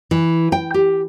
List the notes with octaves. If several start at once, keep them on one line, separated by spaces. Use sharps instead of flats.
E3
G5
G4